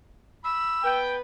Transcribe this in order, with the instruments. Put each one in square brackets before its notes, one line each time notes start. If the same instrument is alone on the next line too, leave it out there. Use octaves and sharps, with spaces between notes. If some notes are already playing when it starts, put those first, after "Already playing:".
[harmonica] B5 [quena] E6
[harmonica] B3 B4 [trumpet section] G5